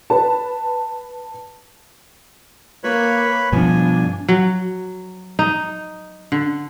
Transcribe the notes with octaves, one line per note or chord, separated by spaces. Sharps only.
B4 A5
A#3 B4 C#5 B5
G2 B2 F3 D4 G#5
F#3
D#4
D3